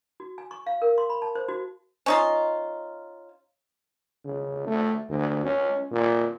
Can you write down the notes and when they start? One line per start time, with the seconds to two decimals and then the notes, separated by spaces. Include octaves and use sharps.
0.20 F#4
0.38 G#5
0.51 C#6
0.66 F5
0.82 A#4
0.98 C6
1.10 B5
1.22 A5
1.35 C5
1.49 F#4
2.06 C#4 D#4 F4
4.25 C#3
4.67 A3
5.09 D2
5.45 C#4
5.91 A#2